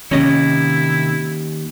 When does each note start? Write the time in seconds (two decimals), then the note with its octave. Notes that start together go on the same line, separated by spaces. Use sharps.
0.11 D#2 C3 D#3 C#4 E4 D#5